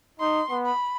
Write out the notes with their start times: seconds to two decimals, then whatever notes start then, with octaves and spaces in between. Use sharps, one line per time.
0.20 D#4 C6
0.50 B3
0.65 B5